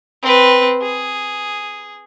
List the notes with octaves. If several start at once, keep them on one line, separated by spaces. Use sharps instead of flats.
C4 B4
G#4